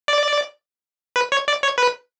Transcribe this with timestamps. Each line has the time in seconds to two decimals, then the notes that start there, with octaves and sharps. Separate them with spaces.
0.08 D5
1.16 B4
1.32 C#5
1.48 D5
1.63 C#5
1.78 B4